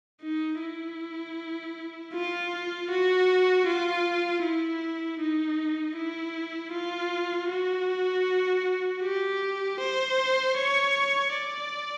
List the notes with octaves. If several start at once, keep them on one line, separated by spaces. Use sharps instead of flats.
D#4
E4
F4
F#4
F4
E4
D#4
E4
F4
F#4
G4
C5
C#5
D5